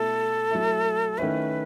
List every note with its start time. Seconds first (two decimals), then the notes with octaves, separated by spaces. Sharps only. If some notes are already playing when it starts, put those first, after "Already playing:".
Already playing: B2 A3 E4 A4
0.51 F#3 A3 E4
1.18 D#3 A3 C#4 E4 B4